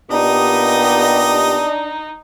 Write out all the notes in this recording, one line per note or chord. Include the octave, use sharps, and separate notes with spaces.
A#2 B3 D4 D#4 G4 D#5